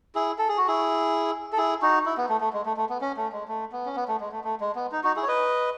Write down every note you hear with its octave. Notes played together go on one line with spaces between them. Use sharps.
E4 G#4
A4
G#4
F#4
E4 G#4
A4
E4 G#4
D#4 F#4
E4
B3
A3
A3
G#3
A3
A3
B3
C#4
A3
G#3
A3
B3
C#4
B3
A3
G#3
A3
A3
G#3
B3
D#4
D#4 F#4
E4 G#4
C#5
B4 D#5